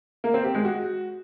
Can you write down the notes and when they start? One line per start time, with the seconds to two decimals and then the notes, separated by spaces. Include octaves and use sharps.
0.24 A#3
0.34 C4
0.44 G4
0.55 G#3
0.65 F#4